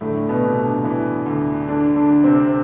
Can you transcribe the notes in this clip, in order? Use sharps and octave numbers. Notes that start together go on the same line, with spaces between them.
D2 A2 A3
B2 B3
C3
D3 D4
E3
D2
D3 D4
D3 D4
D3
C3 C4